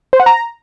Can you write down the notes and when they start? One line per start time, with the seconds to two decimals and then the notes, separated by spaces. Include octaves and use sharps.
0.13 C5
0.20 F#5
0.26 A#5